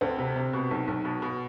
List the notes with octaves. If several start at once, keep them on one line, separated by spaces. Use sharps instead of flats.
D2 C4
C3
C3
B2
B1
B1
B2
B2